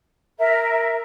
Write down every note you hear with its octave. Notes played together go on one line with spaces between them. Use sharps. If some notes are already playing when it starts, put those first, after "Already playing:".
A#4 E5